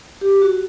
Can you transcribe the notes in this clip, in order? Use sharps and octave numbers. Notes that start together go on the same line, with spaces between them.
G4
F#4